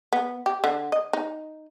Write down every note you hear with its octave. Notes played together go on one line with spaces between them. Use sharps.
B3
G4
D3
D#5
D#4